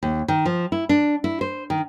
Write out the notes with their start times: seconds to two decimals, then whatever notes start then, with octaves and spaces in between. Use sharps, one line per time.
0.03 D#2
0.28 D#3
0.45 F3
0.72 E4
0.89 D4
1.24 E4
1.41 C5
1.70 D#3